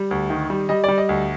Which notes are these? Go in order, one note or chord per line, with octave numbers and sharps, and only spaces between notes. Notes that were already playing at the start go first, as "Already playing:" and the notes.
Already playing: G3
D2
D#3
G3
G3 D#5
G3 D5
D#5
D2